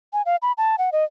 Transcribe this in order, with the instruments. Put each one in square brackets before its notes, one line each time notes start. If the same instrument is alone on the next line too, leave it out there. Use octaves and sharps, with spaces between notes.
[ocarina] G#5
F5
B5
A5
F#5
D#5